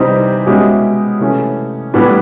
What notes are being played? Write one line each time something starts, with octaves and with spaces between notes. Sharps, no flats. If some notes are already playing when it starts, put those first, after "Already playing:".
Already playing: C3 E3 G3 C4 D#4
B2 G#3 C#4 E4 G4
C3 E3 A3 C#4
A2 E3 G3 B3 D4